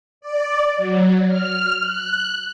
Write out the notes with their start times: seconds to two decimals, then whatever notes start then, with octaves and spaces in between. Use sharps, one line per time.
0.21 D5
0.77 F#3
1.27 F6
1.80 F#6